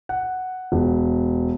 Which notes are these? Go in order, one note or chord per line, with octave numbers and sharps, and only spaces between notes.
F#5
E1